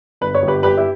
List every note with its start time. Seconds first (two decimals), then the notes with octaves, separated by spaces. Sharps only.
0.21 G1 B4
0.35 C#5
0.43 G1
0.48 G4 B4
0.63 G1 G4 B4
0.77 E4 G4